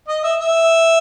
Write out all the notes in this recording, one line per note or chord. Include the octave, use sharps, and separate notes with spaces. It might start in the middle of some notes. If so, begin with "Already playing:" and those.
D#5
E5
E5